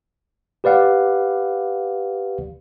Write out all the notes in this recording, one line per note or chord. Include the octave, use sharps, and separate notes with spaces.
G4 B4 D5 F5 F#5